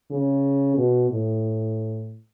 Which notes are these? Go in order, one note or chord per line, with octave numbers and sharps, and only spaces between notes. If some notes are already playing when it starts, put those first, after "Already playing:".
C#3
B2
A2